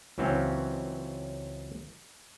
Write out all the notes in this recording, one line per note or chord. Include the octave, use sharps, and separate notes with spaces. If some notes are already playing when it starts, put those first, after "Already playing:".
C#2 E3 F#3 C4 C#4 F5